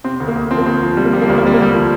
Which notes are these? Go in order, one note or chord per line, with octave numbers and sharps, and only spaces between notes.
C3 C4
D2
A#3
D2
F3 C4
A#3
D2 C4
F3
C3 G3
A#3
F3 G3
A#3
D2 G3
A#3
C3 G3
A#3
D2 G3
F3